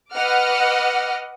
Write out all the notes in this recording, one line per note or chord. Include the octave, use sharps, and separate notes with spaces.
B4 D#5 F#5 D6 F6